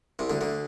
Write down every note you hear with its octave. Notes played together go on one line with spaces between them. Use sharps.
C2 C3
D2 D3
D2 D3